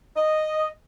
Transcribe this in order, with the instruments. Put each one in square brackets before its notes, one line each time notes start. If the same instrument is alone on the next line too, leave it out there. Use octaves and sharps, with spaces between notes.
[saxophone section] D#5